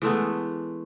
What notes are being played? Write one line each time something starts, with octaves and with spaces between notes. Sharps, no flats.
E3 G#3 A3 B3